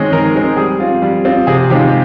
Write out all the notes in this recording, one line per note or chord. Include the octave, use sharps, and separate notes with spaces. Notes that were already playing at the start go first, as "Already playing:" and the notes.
Already playing: D#3 G#3 C4 C#5 D#5
D#3 A#4
G#3 C4
G3 G#4
C4 F4
G3
C4 F4
C3 G#4
D#3 G#3 C4 F4 G4